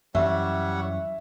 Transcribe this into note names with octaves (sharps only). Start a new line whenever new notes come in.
F#2 E3 G3 C#5 E5 F#5